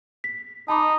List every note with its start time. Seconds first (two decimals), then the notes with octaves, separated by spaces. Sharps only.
0.24 B6
0.68 D#4 A5 B5 D6